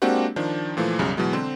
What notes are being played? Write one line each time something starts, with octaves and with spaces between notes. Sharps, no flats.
G#3 A#3 C4 D4 F#4 G4
D#3 F3 D4
A#2 E3 F3 A3
B1 F#2 C#3 G3
B2 E3 F#3 G#3
D3 C4 C5